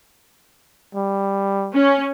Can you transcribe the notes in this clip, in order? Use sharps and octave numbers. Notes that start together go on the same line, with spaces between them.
G3
C#4